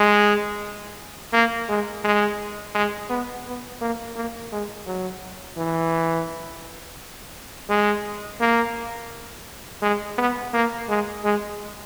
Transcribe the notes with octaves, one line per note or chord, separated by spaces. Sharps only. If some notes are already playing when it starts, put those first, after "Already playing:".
Already playing: G#3
A#3
G#3
G#3
G#3
B3
B3
A#3
A#3
G#3
F#3
E3
G#3
A#3
G#3
B3
A#3
G#3
G#3